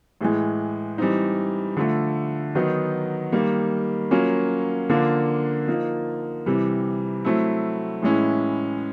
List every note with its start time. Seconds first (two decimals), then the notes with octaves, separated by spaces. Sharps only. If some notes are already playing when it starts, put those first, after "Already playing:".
0.21 A2 E3 G#3
0.98 E3 G3 C4 D#4
1.77 D3 F3 A3
2.55 D#3 F#3 B3 D#4
3.32 D#3 G3 A#3
4.11 F#3 A#3 C#4 F4
4.89 D3 F3 A#3 D4 F4
5.68 F3 A#3 D#4
6.46 C3 E3 G3
7.25 F#3 A3 C4 E4
8.02 A2 E3 G#3 C#4 E4